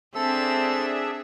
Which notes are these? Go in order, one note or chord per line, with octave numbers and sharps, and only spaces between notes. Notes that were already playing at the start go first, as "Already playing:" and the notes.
C4 D4 G#4 A4 E5 E6